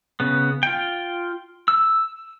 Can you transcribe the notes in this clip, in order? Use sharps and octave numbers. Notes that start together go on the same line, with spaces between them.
C#3 B3
F4 G5
E6